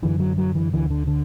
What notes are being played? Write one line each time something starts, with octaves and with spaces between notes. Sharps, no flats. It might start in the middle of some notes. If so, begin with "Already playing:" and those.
F#2 D3 E3
F#3
F#3
E3
D2 D3 E3
D3
D3